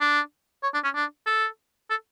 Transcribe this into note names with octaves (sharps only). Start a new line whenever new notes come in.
D4
C#5
D4
C#4
D4
A4
A4